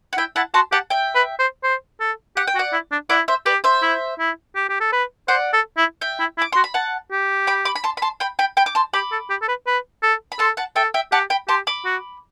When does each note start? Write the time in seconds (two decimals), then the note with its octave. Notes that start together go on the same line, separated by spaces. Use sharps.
0.13 F#5
0.17 E4 E5 G5
0.36 E4 F#5 A5
0.54 F#4 A5 C6
0.72 G4 F#5 A5
0.90 E5 G5
1.15 B4
1.39 C5
1.64 C5
2.00 A4
2.36 G4 F#5
2.48 G5
2.55 F#4
2.59 D5 F#5
2.73 E4
2.92 D4
3.10 E4 D5 F#5
3.28 C5 E5
3.46 G4 B4 D5
3.64 C5 E5
3.82 E4
4.19 E4
4.55 G4
4.69 G4
4.80 A4
4.92 B4
5.28 C5 D5 F#5
5.53 A4
5.77 E4
6.01 E5 G5
6.20 E4
6.38 E4
6.42 D6
6.52 F#4 C6
6.64 B5
6.74 F#5 A5
7.12 G4
7.47 G5 B5
7.65 B5 D6
7.75 B5
7.84 A5 C6
7.97 B5
8.02 A5 C6
8.20 G5 B5
8.39 G5 B5
8.57 G5 B5
8.66 D6
8.75 A5 C6
8.94 G4 B5 D6
9.12 A4
9.30 G4
9.42 A4
9.48 B4
9.67 B4
10.03 A4
10.32 B5
10.39 A4 A5 C6
10.57 F#5 A5
10.76 A4 E5 G5
10.94 E5 G5
11.12 G4 F#5 A5
11.30 G5 B5
11.48 G4 A5 C6
11.67 B5 D6
11.85 F#4